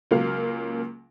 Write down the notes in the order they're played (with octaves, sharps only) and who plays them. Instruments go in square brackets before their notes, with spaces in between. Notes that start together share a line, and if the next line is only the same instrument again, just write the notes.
[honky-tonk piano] C#2 F#3 A#3 F5 F6